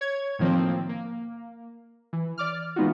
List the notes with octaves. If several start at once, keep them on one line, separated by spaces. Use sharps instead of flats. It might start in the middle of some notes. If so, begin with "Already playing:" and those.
C#5 G#6
A2 D#3 F3 A#3 C4
A#3
E3
D5 D6 F6
E3 G#3 B3 D#4 F4 F#4